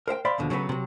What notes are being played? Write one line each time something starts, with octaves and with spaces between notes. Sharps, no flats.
A#4 C5 E5 G5
C5 D5 E5 F5 B5 C6
D#2 B2 D3 F3
C#3 F#3 A3 B3 G4 B4
C3 F#3